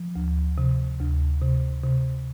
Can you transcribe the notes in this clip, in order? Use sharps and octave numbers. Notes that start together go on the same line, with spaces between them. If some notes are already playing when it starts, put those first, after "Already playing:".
Already playing: F3
D2
C3
D2
C3
C3